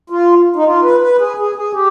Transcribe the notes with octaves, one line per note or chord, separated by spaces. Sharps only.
F4
D#4
F4
B4
B4
G#4
G#4
G#4
G4